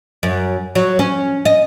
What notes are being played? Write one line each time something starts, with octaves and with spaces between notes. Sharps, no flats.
F#2
F#3
C#4
D#5